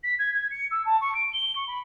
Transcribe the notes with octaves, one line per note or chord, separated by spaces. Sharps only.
B6
G#6
G#6
C#7
E6
A5
C#6
D7
G7
C#6
B5